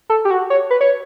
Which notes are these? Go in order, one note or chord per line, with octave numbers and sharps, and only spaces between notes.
A4
G4
F#4
C#5
B4
C#5